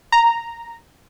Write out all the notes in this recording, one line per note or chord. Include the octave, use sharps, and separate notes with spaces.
A#5